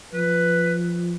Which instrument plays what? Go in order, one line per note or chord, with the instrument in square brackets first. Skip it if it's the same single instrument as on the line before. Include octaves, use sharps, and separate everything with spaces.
[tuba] F3 [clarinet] B4